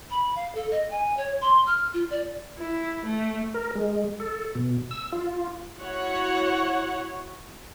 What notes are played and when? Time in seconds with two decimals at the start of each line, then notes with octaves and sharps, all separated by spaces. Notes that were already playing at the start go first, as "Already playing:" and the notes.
0.11 B5
0.36 F5
0.55 A4
0.71 D#5
0.91 G#5
1.17 C#5
1.41 C6
1.67 F6
1.94 F4
2.11 D5
2.59 E4
3.06 A3
3.54 A#4
3.75 G#3
4.20 A4
4.55 B2
4.91 E6
5.12 F4
5.79 E4 F#4 C#5 F#5